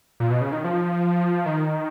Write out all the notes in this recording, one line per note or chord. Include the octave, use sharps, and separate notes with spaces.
A#2
B2
C#3
D#3
F3
D#3